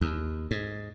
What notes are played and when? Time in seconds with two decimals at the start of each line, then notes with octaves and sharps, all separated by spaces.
0.01 D#2
0.51 G#2